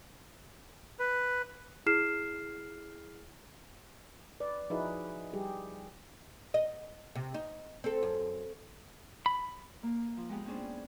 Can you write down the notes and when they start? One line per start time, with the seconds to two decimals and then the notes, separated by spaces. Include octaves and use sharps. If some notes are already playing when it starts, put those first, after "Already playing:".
1.00 B4
1.86 E4 G#4 F6 C7 E7
4.40 B4 D5
4.70 F3 D#4 E4 F#4 G#4 B4
5.33 G3 G4 G#4
6.54 D#5
7.15 C3
7.34 D#4
7.84 C4 A4
8.03 F#2
9.26 B5
9.83 A#3
10.17 F3
10.29 G#3 B3 G4 G#4
10.46 B3 C#4 D4 G#4 C5